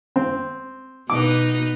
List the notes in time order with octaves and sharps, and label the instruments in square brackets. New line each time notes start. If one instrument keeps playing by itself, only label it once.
[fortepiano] C4
[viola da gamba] B2 D#4 B4 [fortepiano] D6